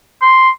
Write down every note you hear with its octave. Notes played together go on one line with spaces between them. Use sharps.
C6